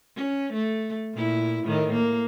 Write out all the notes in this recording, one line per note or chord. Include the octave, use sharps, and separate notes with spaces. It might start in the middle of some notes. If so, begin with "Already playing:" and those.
C#4
A3
A#2 E4
A2 D#3
A#3